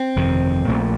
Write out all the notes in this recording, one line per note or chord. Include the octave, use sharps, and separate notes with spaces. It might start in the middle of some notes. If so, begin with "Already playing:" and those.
Already playing: C4
G1 F2 C3 D#3
A#1 A#2 A3